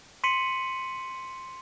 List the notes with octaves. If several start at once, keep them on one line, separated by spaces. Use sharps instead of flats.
C6 B6 C#7 D#7 F#7